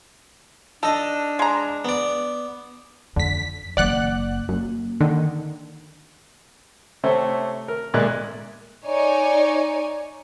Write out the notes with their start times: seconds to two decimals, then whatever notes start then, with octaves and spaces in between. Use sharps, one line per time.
0.83 D4 D#4 A4 D#5
1.39 G#3 A#5
1.85 B3 D5
3.16 F2 D3 B6
3.77 F#1 F#3 D5 F#5 F#6
4.49 F#2 A#3
5.00 D3 D#3
7.04 C3 A3 C5 C#5 E5
7.68 A#4
7.94 B1 G#3 A#3 D5 E5 F#6
8.86 D#4 C#5 D5 G#5